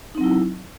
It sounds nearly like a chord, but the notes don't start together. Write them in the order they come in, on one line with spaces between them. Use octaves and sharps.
D#4 C4 F#3 E4